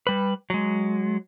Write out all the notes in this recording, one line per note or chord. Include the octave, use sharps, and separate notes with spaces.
G3 B4
F#3 G#3